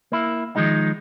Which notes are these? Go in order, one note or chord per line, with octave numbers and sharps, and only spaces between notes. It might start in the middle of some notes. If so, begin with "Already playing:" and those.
A#3 E4
D#3 F3 G#3 D#4